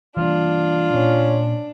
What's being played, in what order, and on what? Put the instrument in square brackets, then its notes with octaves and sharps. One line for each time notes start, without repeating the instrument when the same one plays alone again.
[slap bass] E3 G3 A#3 [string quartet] D4 [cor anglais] F4
[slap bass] A#2 [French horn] C#4